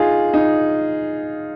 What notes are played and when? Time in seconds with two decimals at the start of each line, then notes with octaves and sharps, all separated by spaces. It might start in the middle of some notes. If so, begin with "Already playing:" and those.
Already playing: D#4 F4 G#4
0.34 D#4